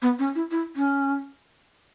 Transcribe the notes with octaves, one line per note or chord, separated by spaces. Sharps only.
B3
C#4
E4
E4
C#4